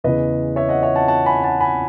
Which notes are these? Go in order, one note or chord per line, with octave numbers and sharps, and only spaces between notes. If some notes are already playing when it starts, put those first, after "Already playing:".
E2 C#3 E3 B4 D#5
C#5 E5
D#5 F#5
C#5 E5
F#5 A5
F#5 A5
G#5 B5
F#5 A5
G#5 B5